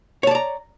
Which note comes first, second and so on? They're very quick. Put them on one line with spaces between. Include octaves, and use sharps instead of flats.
C#5 A5 D5 A#5